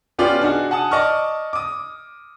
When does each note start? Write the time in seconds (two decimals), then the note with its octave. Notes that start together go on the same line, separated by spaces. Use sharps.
0.18 B3 C#4 F4 G4 D5
0.41 D4 D#4 F#4 G#4
0.71 F#5 G#5 A5 D#6
0.91 D5 D#5 A5 C#6 F6
1.53 D6 D#6